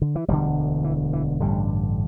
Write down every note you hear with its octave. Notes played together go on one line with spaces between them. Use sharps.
D3
E3
E1 D2 D3 G3
E3
E3
A1 G2 D3 G3